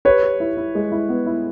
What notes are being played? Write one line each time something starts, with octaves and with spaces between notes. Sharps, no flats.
G4 B4 C#5
G4
E4
E4
G#3
E4
B3
E4